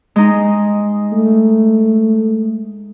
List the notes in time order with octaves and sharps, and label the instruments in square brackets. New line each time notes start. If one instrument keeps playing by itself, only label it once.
[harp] G#3 D#4
[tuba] A3